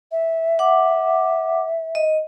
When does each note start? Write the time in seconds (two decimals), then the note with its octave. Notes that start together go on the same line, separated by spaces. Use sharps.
0.11 E5
0.59 F#5 D6
1.95 D#5